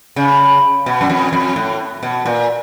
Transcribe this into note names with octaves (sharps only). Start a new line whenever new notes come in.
C#3
B2
F#2
F2
F2
A2
B2
A#2